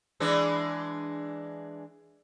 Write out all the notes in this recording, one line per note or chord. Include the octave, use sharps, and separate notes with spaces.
E3 G#3 D4